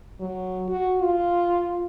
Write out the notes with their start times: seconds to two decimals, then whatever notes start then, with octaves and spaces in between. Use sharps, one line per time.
0.20 F#3
0.69 F#4
1.02 F4